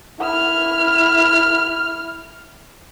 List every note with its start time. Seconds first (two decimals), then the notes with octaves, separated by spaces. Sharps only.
0.20 E4 F6